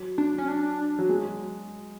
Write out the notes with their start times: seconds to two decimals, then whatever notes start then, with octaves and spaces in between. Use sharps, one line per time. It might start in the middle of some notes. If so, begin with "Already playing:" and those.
Already playing: F#3
0.18 D4
0.38 C#4
0.48 D4
0.99 F#3
1.09 G#3